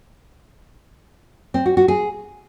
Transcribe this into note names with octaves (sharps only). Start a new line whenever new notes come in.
C4
F#4
F#4
G#4